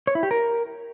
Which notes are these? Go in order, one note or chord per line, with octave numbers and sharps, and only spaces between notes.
C#5
E4
G4
A#4